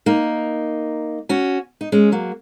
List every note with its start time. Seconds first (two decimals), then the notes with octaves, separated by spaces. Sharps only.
0.06 A#3 D#4
1.29 C#4 F#4
1.81 D#4
1.92 G#3 C#4
2.12 F#3 A#3